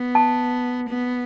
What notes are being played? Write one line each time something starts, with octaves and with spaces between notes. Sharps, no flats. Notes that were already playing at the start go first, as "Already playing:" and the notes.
Already playing: B3
A5
B3